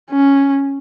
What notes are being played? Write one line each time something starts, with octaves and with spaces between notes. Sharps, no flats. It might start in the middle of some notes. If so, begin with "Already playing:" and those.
C#4